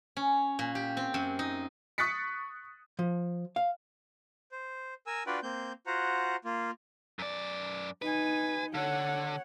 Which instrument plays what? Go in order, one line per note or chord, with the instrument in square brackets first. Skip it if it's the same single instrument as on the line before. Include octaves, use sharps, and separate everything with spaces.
[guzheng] C#4
A#2
G4
C4
F#2
D#4
[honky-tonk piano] C#6 D#6 F#6 A6 B6 C#7
[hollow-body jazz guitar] F3
F5
[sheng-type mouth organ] C5
A#4 G#5 E6
D4 F4 F#4 B4 D5 G5
A#3 C4 G6
F4 F#4 C5 F#5 A#5
A#3 F4
[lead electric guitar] F#2 D5
[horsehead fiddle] D#4 G#5 [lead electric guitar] B4
[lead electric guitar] D3 [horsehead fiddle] C#5 F#5